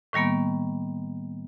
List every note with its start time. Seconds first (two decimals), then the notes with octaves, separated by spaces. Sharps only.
0.13 A2 D#3 G3 A#3 B3